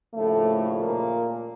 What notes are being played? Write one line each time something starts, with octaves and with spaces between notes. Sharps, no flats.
D#2 A2 C#3 F3 A3
A#2 A#3